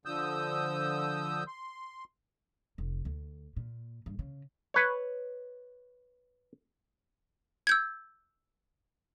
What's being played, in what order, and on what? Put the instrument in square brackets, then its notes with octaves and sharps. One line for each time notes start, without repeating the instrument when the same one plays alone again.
[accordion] D3 F3 D#6 E6 G6
C6
[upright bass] F1
D2
A#2
G2
C#3
[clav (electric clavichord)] B4 C#5
[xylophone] E6 G6 G#6